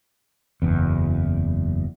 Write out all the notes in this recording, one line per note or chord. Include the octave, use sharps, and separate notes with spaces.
F#1 E2